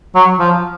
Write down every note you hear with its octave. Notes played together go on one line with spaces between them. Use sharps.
F#3
F3